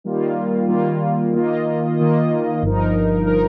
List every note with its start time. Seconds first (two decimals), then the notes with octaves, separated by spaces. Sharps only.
0.04 D#3 G3 A#3 F4
0.68 D#3 G3 A#3 F4
1.33 D#3 A#3 F4 D#5
1.97 D#3 A#3 F4 D#5
2.63 G1 G2 F3 D#4 A#4
3.27 F3 D#4 A#4